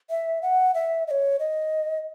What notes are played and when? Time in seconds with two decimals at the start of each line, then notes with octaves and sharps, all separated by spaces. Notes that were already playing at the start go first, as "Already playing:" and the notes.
0.10 E5
0.42 F#5
0.75 E5
1.07 D#5
1.11 C#5
1.39 D#5